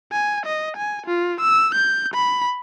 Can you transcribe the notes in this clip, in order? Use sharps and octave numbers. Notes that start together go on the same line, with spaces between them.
G#5
D#5
G#5
F4
E6
G6
B5